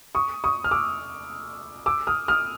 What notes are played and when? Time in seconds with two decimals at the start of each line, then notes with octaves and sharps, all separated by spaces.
0.15 C#6 D#6
0.44 C#6 D#6
0.64 F6
0.71 D6 E6
1.86 D6 E6
2.07 D#6 F6
2.28 D#6 F6